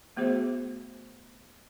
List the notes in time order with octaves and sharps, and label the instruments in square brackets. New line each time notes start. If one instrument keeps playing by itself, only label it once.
[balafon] A3 B3 F#4 G#4 C5 E5